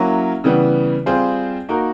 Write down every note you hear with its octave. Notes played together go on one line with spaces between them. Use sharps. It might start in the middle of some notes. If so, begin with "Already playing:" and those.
Already playing: F#3 A#3 C#4 E4
C#3 E3 G3 B3
G3 C4 F4 G#4 C5
A#3 D#4 F#4 A#4